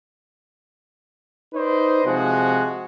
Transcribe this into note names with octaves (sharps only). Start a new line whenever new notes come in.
D#4 B4 C5 D5 D#5
C3 F3 G#3 F#4